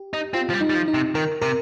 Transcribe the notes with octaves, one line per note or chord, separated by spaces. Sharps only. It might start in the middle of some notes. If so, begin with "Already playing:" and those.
Already playing: G4
D#4
C4 F4
F3
G3
D#4
G3
F3
D#4
C3
D#3 A#4
C3 A#4